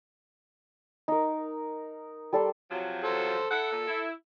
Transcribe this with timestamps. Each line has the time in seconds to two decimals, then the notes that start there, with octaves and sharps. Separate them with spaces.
1.08 D#4 A#4
2.33 G3 A4 D5 C6
2.71 C3 F3 F#3
3.04 A4 C5
3.50 E4 A4 F#5
3.72 A#2
3.87 E4